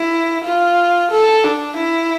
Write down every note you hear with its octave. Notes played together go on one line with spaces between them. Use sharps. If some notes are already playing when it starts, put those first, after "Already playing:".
Already playing: E4
F4
A4
D4
E4